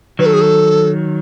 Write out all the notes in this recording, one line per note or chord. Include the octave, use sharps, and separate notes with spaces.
D#3 F#3 B4
A4
G#4
A4